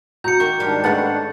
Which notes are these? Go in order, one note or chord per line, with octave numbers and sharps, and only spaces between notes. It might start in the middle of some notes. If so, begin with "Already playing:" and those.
F#4 A#5 G6 C#7
D#3 A#3 C#6
G#2 D#3 G3 D4 F4
G#3 A3 C#4 B4 F#5 A6